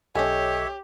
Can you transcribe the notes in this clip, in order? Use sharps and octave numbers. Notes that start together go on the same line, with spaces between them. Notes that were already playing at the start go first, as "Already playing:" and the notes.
B1 C#4 G4 A4 C#5 D#5 E5 G#5